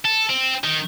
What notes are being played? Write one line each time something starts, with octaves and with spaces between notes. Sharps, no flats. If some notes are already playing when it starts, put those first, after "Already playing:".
A4
C4
D#3